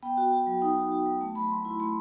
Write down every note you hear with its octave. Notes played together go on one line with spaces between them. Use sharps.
B3 G5
F#4
F#4
F#3
D#4
F#4
F#4
F#3
A3 A5
F#3 B5
F#3 C6
E4 C6
A3 C6